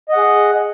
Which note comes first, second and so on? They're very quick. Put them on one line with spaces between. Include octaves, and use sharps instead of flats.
D#5 F#5 G#4